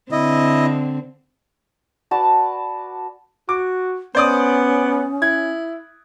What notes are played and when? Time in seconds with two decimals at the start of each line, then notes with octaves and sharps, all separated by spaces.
0.12 D3 C4 E4 D#5
2.11 F#4 B4 D5 A5
3.49 F#4 D6
4.15 B3 C#4 C5 D5 D#6
5.22 E4 G#6